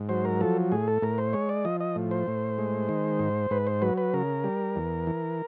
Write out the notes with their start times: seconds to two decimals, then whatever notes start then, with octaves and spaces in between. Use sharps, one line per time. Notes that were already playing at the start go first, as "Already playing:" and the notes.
Already playing: G#2
0.09 F#3 C5
0.25 A#4
0.41 F3 A4
0.72 A2 G#4
0.88 A4
1.02 A2 A#4
1.18 C5
1.33 G#3 C#5
1.49 D5
1.65 F3 D#5
1.80 D#5
1.96 A2
2.11 C5
2.27 A2
2.58 G#3
2.89 D#3
3.19 G#2
3.51 G#2 B4
3.67 C5
3.82 F#3 B4
3.98 B4
4.14 C#3 A#4
4.44 G3
4.76 E2
5.07 E3